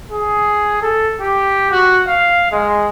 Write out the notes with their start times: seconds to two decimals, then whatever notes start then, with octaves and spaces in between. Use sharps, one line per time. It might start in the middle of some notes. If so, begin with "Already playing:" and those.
0.11 G#4
0.82 A4
1.21 G4
1.71 F#4
2.08 F5
2.52 G#3